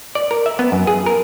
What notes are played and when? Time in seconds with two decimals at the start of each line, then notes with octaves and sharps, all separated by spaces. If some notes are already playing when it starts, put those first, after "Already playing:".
0.15 D5
0.31 A#4
0.46 E5
0.59 B3
0.72 F#2
0.87 G#4
1.06 A#4